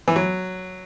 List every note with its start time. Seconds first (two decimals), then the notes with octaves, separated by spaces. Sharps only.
0.08 E3
0.16 F#3